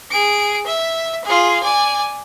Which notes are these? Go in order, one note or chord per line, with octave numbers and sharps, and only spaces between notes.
G#4 D7
E5
F4 G#4
D5 G#5